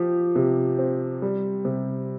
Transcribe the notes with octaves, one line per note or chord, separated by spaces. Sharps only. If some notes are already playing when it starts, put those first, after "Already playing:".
Already playing: F3 G4
C3
C4
G3
C3